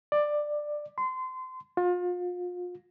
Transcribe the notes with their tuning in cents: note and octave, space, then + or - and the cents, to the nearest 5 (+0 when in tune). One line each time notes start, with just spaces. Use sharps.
D5 +15
C6 -25
F4 +35